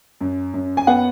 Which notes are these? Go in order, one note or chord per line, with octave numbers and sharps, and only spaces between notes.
F#2
F#2
G#5
B3 F#5